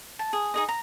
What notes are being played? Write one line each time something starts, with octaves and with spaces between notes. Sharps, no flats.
A5
G#4
D#4 G#4 D#5
A#5